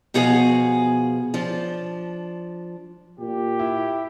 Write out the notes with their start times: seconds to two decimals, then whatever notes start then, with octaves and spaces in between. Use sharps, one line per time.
0.14 B2 F3 F#4 G#4 F5
1.34 F3 D4
3.20 A#2 G4
3.59 E4